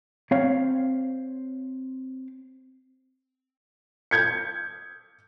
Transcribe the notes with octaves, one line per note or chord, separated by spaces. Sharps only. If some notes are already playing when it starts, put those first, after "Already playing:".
C4 C#5 F5
G6 G#6 C#7